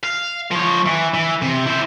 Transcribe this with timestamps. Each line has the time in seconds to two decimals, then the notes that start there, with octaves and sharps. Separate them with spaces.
0.03 F5
0.51 F3 C#5
0.86 E3
1.14 E3
1.42 C3
1.66 E4 C5